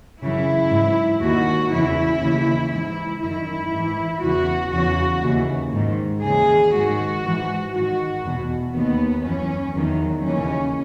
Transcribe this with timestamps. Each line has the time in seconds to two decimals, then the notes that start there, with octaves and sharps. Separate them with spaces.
0.21 F#2 C#3 E3 E4
0.70 G#2
0.75 E3
1.20 D#2 D#3 F#4
1.71 E2 C#3 E3 E4
2.21 D#2 C#3 E3
2.72 G#2 E3 E4
3.21 F#2 D#3 E4
3.72 G#2 E3
4.22 E2 C#3 E3 F#4
4.72 E2 C#3 E3 F#4
5.23 D#2 C#3 E3
5.72 G#2 D#3
6.22 D#2 C#3 E3 G#4
6.73 G#2 D#3 F#4
7.23 G#2 E3
7.73 G#2 D#3 F#4
8.23 E2 B2
8.74 D#2 D#3 B3
9.24 F#2 E3 C#4
9.74 E2 D#3 F#3
10.24 D#2 C#3 E3 C#4